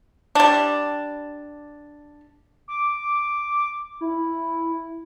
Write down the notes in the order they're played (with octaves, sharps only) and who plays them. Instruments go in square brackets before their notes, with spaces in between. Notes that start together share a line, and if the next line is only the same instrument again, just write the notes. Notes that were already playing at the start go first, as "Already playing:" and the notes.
[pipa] G3 D4
[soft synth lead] D6
E4